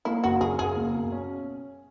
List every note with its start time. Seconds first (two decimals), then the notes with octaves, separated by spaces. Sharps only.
0.05 A#3 E4
0.24 F#1 F#4
0.41 F#1 G#4
0.59 F#1 G#4
0.77 A#3
0.94 B2
1.12 C#4